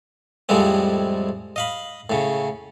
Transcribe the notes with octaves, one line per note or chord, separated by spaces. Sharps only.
F2 A2 F3 G3 G#3 C4
D#5 F5 B5
A2 C#3